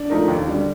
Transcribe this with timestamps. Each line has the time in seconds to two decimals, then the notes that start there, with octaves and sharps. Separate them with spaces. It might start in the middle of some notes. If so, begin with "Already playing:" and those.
Already playing: D4
0.10 F3 A3 D#4 A#4
0.28 D#2
0.48 D3 G3